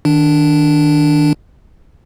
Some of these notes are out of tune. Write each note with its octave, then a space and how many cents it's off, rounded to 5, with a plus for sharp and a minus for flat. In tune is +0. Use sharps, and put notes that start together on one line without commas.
D#3 +0 D4 +0